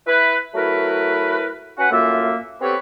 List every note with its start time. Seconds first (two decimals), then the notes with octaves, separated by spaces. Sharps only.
0.07 E4 B4
0.55 F#3 A3 E4 A#4 B4
1.78 C#4 F#4 B4 F#5
1.91 F#2 A2 A#3 F4 E5
2.61 B3 C4 G4 A4 B4 C#5